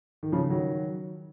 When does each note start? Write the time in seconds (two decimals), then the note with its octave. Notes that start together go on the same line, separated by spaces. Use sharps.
0.23 D#3
0.32 C#3 F3
0.50 D#3 F#3